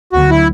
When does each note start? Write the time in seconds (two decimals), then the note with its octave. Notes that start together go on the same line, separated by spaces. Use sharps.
0.13 D2 D3 F#3 B3 F#4
0.30 E4